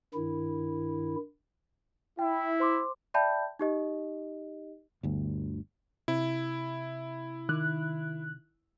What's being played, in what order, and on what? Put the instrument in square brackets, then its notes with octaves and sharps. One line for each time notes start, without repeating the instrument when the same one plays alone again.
[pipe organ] G2 D#3 E4
[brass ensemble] E4 [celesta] G5
[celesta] C5 C6 D6
D5 E5 G5 A5 B5 G6
D#4 G4 D#5
[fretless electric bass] G1 D2
[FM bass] C3 [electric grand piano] E4
[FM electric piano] D#3 F#6